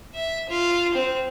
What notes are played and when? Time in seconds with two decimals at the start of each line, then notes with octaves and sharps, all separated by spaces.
0.15 E5
0.49 F4
0.94 C4